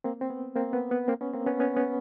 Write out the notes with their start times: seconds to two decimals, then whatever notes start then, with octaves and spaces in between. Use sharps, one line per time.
0.04 A#3 C4
0.21 C4
0.30 B3
0.56 A#3 C4
0.73 B3
0.91 B3
1.08 A#3 C4
1.21 B3 C#4
1.33 A#3 C4
1.46 B3 C#4
1.60 B3 C#4
1.77 B3 C#4